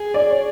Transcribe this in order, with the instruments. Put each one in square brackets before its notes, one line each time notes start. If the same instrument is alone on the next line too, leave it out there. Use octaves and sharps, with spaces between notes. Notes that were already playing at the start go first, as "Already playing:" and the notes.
Already playing: [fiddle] G#4
[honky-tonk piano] D5
C#5